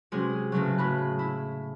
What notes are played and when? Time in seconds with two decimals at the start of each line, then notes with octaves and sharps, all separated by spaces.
0.12 C3 F#3 G#3 C#4 F#4 G#4
0.52 A2 C#3 F#3
0.78 A2 G#4 B5 F#6
1.19 E4